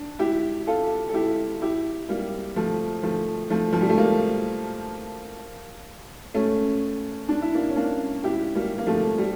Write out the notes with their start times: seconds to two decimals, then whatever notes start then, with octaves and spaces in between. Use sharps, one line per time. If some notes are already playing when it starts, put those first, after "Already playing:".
Already playing: D4
0.19 E4 G4
0.67 F4 A4
1.09 A4
1.14 E4 G4
1.62 E4 G4
2.09 G3 A#3
2.56 F3 A3
3.03 F3 A3
3.50 F3 A3
3.73 F3
3.81 G3
3.89 A3
3.98 G3 A#3
6.34 A3 C#4
7.29 D4
7.42 E4
7.55 A#3 D4
7.69 C#4
7.76 A#3 D4
8.24 E4 G4
8.55 G3 A#3
8.78 A#3
8.87 F3 A3
9.18 G3